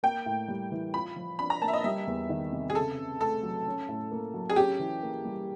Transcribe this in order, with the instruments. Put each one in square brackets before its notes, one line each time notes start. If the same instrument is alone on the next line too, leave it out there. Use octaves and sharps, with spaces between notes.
[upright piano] A#3 [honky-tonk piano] G5
[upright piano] A2
G3
E3
[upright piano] F4 [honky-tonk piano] B5
[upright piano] F3
[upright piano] D4 [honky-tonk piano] B5
[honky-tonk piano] A#5
[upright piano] A#3 [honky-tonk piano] A5
[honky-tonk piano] E5
D#5
[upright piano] G3 [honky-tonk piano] E5
[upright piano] E2
D#3
C3
[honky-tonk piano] G#4
[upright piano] C#3 [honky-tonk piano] A4
[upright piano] C#3
[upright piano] A3 [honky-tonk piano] A4
[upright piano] F#3
C#4
A2
A#3
F#3
[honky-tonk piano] G#4
[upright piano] C#4 [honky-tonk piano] G4
[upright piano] E3
A#3
G3